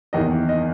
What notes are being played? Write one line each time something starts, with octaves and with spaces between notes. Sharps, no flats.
F#1 E2 D#3 D#5
D#5